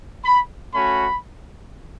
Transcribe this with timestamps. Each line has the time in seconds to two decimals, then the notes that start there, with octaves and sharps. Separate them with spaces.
0.25 B5
0.73 A3 C#4 F#4 B5